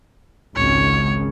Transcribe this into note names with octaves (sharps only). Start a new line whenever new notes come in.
G#1 C#2 C#3 C#5